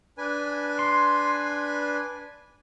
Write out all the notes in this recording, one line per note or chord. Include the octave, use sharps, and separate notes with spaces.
D4 B4 G#5
C6